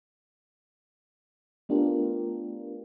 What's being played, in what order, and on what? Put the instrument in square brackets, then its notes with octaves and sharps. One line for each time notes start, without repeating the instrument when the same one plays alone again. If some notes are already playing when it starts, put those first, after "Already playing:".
[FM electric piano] A3 B3 D4 F4 G4 A#4